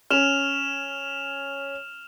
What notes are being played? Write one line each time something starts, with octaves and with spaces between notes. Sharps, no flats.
C#4 F6 E7 F7